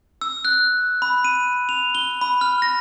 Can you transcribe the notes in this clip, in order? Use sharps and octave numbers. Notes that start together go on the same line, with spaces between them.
E6
F#6
B5
D#7
F7
G7
B5
F6
A#6